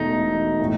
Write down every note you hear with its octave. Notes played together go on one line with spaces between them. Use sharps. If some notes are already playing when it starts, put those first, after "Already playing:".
Already playing: E1 E2 B2 A3 D#4
A2 E3